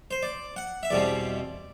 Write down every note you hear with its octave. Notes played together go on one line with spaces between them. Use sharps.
C5
D5
F#5
E5
E2 B2 G3 C4 D5